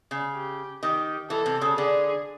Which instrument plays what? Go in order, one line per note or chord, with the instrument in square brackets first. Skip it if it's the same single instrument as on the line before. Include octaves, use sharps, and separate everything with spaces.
[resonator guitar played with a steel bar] C#3
[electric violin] G4
[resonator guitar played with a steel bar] D#3 [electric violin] G4
[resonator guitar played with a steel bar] E3 [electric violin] A4
[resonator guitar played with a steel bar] C3
C#3
[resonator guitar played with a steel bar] D3 [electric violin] G#4